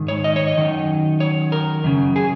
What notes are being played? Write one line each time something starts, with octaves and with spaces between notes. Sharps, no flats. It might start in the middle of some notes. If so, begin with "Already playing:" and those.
Already playing: G#2 D#3
C#5
D#5
C#5
D#5
F#2 D#3
C#5
A#4
F#2 C#3
G#4